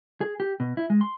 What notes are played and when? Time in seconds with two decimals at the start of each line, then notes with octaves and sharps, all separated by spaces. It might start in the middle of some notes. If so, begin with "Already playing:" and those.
0.21 G#4
0.40 G4
0.60 B2
0.77 E4
0.90 G#3
1.01 C6